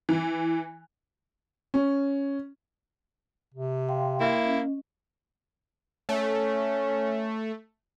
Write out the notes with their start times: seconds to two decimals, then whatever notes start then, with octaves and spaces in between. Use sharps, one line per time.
0.09 E3
1.74 C#4
3.54 C3
3.89 F5 G5 C6
4.20 A#3 E4
4.43 C#4 D#5
6.09 A3 C#4